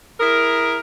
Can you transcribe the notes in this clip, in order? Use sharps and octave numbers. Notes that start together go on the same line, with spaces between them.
E4 G#4 A#4